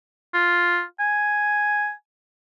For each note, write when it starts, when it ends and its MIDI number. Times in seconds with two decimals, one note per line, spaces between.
0.34 0.82 65
1.00 1.92 80